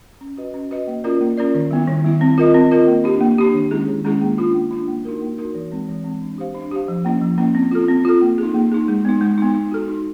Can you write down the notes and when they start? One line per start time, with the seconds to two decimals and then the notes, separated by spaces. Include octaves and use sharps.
0.21 C#4
0.37 F#4 B4 D#5
0.54 C#4
0.71 F#4 B4 D#5
0.87 A#3
1.04 C#4 F4 A#4 D5
1.21 A#3
1.38 C#4 F4 A#4 D5
1.55 D#3
1.71 G3 B3 E4
1.88 D#3
2.04 G3 B3 E4
2.21 C4
2.38 F4 A#4 D#5
2.54 C4
2.71 F4 A#4 D#5
2.87 A#3
3.04 D4 G4
3.21 A#3
3.38 D4 G4
3.54 D#3
3.71 G#3 C#4 E4 G#4
3.88 D#3
4.05 G#3 C#4 E4 G#4
4.21 A#3
4.38 D4 F4
4.54 A#3
4.71 D4 F4
4.88 A#3
5.05 D#4 F#4 A#4
5.21 A#3
5.38 D#4 F#4 A#4
5.55 E3
5.71 G#3 C4
5.88 E3
6.04 G#3 C4
6.21 D4
6.38 G4 C5 F5
6.55 D4
6.71 G4 C5 F5
6.88 F3
7.05 A#3 C#4 E4
7.21 F3
7.38 A#3 C#4 E4
7.55 C4
7.71 F4 A4
7.89 C4
8.05 F4 A4
8.21 A#3
8.38 D#4 G#4
8.54 A#3
8.72 D#4 G#4
8.88 G#3
9.05 B3 D#4
9.21 G#3
9.38 B3 D#4
9.54 D#4
9.71 F#4 A4
9.88 D#4